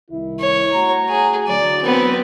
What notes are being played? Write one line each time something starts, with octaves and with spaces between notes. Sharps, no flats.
C2 D#3 E4
C#5
A3 F#4 A#5
G#4
D2 E3 F#3 D5
B3 C4